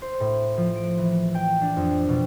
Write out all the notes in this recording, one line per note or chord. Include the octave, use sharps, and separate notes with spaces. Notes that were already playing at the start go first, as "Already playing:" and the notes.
C5
A2
F3
D7
E3
G5
D4
F2
B2